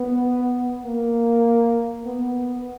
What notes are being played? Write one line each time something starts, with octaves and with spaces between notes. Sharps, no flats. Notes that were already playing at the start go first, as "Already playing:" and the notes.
Already playing: B3
A#3
B3